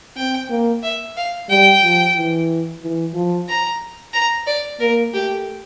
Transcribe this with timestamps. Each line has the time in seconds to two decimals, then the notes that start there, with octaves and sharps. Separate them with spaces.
0.17 C4 G5
0.50 A#3
0.83 E5
1.17 F5
1.49 G3 G5
1.83 F3
2.16 E3
2.82 E3
3.14 F3
3.48 A#5
4.13 A#5
4.46 D5
4.80 A#3 A#4
5.14 A3 G4